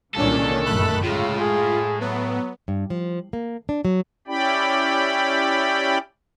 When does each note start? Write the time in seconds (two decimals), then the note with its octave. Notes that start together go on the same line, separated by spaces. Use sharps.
0.15 C2 A#2 D#3 E3 G#3 C#4 D4 A4
0.66 G1 F#2 A#2 A3 B5 F#6
1.03 A2 C#3 G#3 F4
1.40 G#4
2.01 F#3 B3
2.68 G2
2.90 F3
3.33 A#3
3.69 D4
3.85 F#3
4.28 C#4 E4 G4 D5 G5 B5